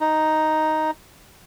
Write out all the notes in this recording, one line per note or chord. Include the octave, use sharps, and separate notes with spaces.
D#4